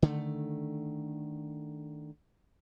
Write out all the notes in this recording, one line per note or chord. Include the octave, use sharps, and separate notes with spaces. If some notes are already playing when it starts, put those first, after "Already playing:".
D3 D#3 A3